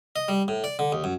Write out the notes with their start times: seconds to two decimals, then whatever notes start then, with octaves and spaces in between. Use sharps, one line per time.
0.16 D#5
0.28 G3
0.48 A2
0.64 D5
0.79 D3
0.92 D#2
1.04 F#2